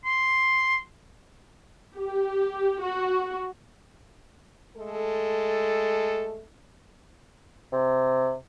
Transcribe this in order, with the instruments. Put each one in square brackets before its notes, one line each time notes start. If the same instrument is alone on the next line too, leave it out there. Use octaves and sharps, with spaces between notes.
[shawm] C6
[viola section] G4
F#4
[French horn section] G#3 A3 A4
[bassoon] C3